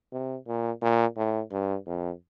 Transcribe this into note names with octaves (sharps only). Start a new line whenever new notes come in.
C3
A#2
A#2
A2
G2
F2